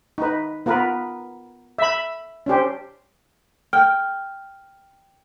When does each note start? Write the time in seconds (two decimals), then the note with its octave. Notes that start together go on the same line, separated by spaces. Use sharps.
0.18 D#4 B4
0.66 B3 F4 A#4 B4
1.79 E5 B5
2.46 C#4 D4 G4 C5
3.73 G5 F6